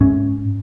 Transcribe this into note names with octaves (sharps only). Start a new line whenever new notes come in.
G#2 C#4